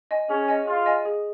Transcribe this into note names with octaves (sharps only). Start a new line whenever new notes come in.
D#5 G#5
C#4 G#4
D#5 G#5
F4 G#4
D#5 G#5
G#4